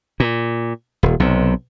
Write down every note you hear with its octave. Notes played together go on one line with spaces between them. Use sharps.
A#2
D#1
B1 C3